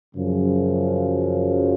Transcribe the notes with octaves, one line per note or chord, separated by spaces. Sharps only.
F#2 C#3 F3